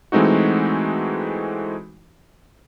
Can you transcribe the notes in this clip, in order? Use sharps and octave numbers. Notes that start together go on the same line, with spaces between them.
E3 G#3 A3 C4 D#4 F#4